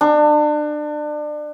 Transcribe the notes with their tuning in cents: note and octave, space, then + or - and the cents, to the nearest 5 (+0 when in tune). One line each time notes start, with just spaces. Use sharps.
D4 +30